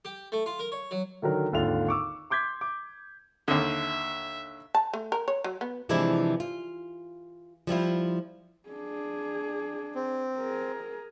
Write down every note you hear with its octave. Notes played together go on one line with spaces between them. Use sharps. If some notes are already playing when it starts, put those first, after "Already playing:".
G4
A3
F4
A#4
C#5
F#3
D3 D#3 F#3 A#4
G#1 D#2 D3 F4 F7
C#6 D6 E6
C6 D6 G6 G#6 B6
D6
D#2 D3 E5
A5
A3
A#4
C#5
F#3
B3
C3 E3 F3 G#3 D4 E4
F4
F3 G3 E4 F4
D4 G#4
C4
G#4 A#4